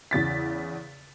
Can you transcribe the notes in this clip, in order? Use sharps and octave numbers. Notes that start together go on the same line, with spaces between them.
E2 C#3 A6 B6